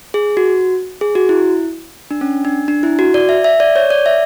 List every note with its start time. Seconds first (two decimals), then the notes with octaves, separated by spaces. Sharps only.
0.14 G#4
0.37 F#4
1.01 G#4
1.15 F#4
1.29 E4
2.11 D4
2.21 C#4
2.45 D4
2.68 D4
2.83 E4
2.99 F#4
3.14 D5
3.29 E5
3.44 E5
3.60 D5
3.76 C#5
3.90 D5
4.06 E5